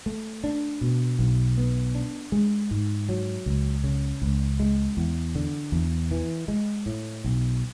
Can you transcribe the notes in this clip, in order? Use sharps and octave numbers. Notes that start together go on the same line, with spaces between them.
A3
D4
B2
B1
B3
D4
G#3
G#2
F#3
C#2
C#3
C#2
G#3
E2
D3
E2
E3
G#3
A2
B1